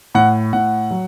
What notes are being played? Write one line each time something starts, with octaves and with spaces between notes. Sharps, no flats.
A2 F#5
A2 F#5
F#3